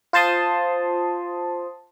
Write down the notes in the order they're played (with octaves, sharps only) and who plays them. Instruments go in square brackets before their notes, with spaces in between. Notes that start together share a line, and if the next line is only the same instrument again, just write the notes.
[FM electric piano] F4 C5 A5 C6 D#6